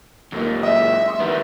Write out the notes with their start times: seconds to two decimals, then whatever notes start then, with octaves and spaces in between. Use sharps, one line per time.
0.32 D#1 F#2 A#2 A#3 D#4
0.63 G#3 D#5 E5
1.08 C6 C#6 D#6
1.20 D#3 G3 B3 E4 A#4